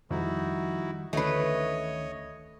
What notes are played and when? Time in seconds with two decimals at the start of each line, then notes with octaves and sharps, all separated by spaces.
0.10 F2 D#3 G3 D#4 E4 F#4 A#5
1.13 D2 D#3 E3 A3 C#4 B4 C#5 D#5